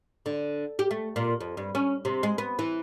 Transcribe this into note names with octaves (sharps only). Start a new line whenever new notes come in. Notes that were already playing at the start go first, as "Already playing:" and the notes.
D3
G4
A3
A#2
F2
G2
C#4
C3
G#3
B3
E3